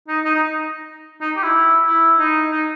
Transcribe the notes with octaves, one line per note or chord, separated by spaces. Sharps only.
D#4
D#4
D#4
D#4
G4
E4
E4
D#4
D#4